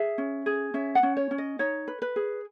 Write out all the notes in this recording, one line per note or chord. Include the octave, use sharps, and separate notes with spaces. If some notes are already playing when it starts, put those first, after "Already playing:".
Already playing: G#4 E5
C#4
G#4
C#4 E5
F#5
C#4
C#5
C#4
D#5
D#4 C#5
B4
B4
G#4